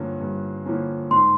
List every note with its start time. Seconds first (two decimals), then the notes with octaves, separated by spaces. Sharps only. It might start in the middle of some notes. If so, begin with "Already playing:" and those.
Already playing: G2 D3 F3 A#3 C#4
0.20 G2
0.66 D3 F3 A#3 C#4
1.11 G#2 C6